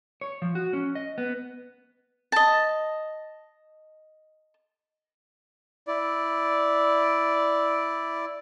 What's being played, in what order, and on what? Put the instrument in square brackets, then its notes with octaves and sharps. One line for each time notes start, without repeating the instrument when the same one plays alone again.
[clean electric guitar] C#5
F3
F#4
C#4
D#5
B3
[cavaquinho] D#5 A5
[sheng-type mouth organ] E4 D5